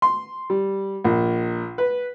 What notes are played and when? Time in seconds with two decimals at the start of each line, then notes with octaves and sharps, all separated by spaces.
0.02 C6
0.50 G3
1.04 A#1
1.78 B4